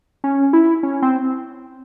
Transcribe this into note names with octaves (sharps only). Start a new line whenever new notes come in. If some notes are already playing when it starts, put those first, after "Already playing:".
C#4
E4
C#4
C4